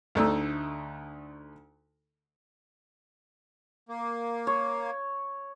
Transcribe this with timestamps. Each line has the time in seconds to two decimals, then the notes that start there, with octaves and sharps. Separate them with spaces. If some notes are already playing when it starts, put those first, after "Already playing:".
0.15 D2 D3 A3 D#4 E6
3.89 A#3
4.47 C#5